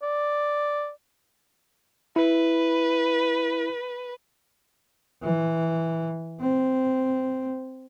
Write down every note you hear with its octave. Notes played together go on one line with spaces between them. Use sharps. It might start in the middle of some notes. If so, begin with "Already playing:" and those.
D5
E4 B4
E3
C4